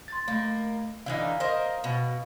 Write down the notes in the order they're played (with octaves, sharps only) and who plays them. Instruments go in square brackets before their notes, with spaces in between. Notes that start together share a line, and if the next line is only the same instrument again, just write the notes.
[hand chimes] C6 A6
[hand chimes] A3 [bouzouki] A#3
[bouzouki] D3 E3 D#4 [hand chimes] F5
[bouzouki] A#4 C5 D#5
B2